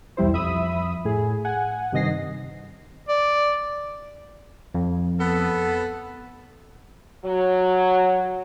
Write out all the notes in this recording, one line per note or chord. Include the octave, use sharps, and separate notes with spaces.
B1 E2 G3 E4 C5
F2 E5 B5 D#6
A2 G#4
F#5 G#5
G2 C3 D#3 D#5 A#6 C7
D5
F2
B3 A4
F#3